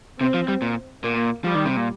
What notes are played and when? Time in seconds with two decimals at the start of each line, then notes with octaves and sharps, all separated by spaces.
0.20 C3 C4
0.34 F3
0.48 G3
0.62 A#2
1.04 A#2 A#3
1.44 F3 G3
1.55 D#3
1.65 C3
1.77 A#2